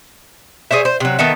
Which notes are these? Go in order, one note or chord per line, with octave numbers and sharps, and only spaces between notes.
G#4 C5 C#5 E5
C5
C3 F#3
D#3 B3 A4 E5